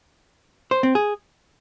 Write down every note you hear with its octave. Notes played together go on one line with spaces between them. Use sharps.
C5
C4
G#4